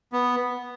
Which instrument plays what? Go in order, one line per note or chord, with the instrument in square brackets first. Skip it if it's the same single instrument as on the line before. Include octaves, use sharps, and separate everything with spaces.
[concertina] B3